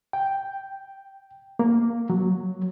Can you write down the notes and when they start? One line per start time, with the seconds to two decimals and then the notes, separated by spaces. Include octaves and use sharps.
0.13 G5
1.59 A#3
2.10 F#3